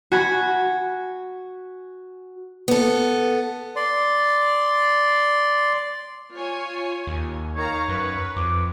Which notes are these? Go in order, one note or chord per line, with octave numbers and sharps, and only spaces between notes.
F#4 G#5 B5
B3 A4
D5 C6
F4 C#5 G#5
D#2
D#3 C#5 F5 A#5
F#2 B4
F2 D6